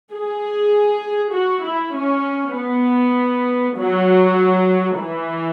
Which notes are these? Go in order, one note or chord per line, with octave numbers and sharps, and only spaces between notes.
G#4
F#4
E4
C#4
B3
F#3
E3